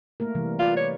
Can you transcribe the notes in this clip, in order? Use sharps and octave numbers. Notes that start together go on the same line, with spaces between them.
A3 A#3 A#4
C3 E3 G3
F4 B4 D5
C#5